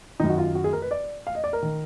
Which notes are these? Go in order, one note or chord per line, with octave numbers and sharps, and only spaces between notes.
F#2 D#3 D#4
F#4
F4
F#4
G#4
A#4
B4
D5
F5
D#5
D5
A#4
D#3